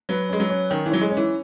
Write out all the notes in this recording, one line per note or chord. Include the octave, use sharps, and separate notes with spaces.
F#3 B4
G#3 C#4
F#3
C#4
D#3 C#4
E3
F#3 C#5
G#3
C#4
E3